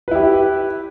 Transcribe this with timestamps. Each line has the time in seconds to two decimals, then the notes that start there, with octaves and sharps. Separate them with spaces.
0.08 B4
0.11 E4
0.15 G4